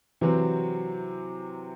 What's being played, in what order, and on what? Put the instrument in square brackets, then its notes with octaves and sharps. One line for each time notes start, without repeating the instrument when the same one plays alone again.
[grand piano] C3 F#3 C4 [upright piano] E3